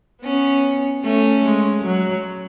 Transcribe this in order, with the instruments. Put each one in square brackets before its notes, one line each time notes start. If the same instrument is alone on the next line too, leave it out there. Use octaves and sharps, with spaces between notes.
[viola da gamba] B3 [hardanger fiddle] C#4
[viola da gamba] A3 [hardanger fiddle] C#4
[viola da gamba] G#3
F#3